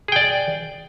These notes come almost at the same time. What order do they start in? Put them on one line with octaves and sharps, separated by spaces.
G#4 G5 D5